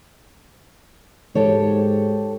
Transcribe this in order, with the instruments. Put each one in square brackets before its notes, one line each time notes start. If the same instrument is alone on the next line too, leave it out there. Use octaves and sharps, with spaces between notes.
[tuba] G#2 [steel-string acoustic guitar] G4 A4 C#5